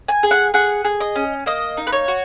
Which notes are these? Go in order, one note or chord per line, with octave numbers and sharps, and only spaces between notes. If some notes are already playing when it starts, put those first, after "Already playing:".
G#5
G#4
F#5
G#4 F#5
G#4
D#5
C#4
A#3 D#5
D#4
B4
C#5
F#4